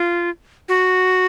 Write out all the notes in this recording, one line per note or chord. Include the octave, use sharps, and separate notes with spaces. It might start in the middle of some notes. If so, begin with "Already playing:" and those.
Already playing: F4
F#4